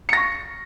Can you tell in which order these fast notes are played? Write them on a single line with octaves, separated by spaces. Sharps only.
C#7 A#6 C#6